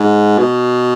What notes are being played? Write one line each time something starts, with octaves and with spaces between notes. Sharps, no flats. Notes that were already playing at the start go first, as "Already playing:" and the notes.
Already playing: G#2
B2